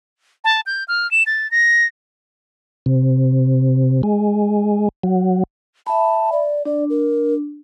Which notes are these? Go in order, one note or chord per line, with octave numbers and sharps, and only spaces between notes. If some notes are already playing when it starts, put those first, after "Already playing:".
A5
G6
F6
E7
A6
A#6
C3
G#3
F#3
E5 A5 B5
D5
D4 D5
A#4